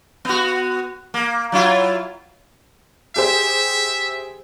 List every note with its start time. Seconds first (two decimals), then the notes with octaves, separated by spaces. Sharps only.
0.25 B3 F#4
1.14 A#3
1.52 F#3 E4 F4
3.16 G4 G#4 C5 E5